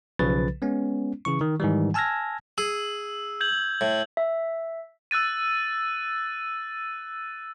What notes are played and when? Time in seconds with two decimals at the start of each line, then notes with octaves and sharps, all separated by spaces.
0.19 B1 C#3 F3 B4 A6
0.62 G#3 B3 C#4
1.25 C#3 E3 C#6
1.41 D#3
1.60 G#2 D#3 E3 G3
1.94 G#5 A5 E6 F6 G#6 A#6
2.58 G#4 E6
3.41 G6 G#6 F#7
3.81 A2
4.17 E5
5.11 E6 F#6 A6 D#7